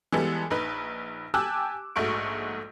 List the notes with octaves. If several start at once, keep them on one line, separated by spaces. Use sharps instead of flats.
E3 G3 G#3 B3 A4
A#1 D#4 B4
G4 G#5 A5 D6 E6 F#6
A#1 G#2 A3 F#4 C#6 D7